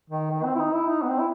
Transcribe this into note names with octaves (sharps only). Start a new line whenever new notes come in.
D#3
D#3
C4
E4
D#4
E4
D#4
B3
C4
E4